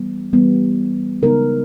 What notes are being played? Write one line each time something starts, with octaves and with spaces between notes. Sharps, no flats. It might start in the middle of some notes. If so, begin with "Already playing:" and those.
Already playing: E3 G3 B3
E3 G3 B3
C#3 G#3 B3 D#4 A#4